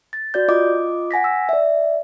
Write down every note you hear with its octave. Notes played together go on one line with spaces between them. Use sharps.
A6
F#4 D5 G6
F4 D#5 D6
F#5 G#5 A#6 B6
E6
D5 E5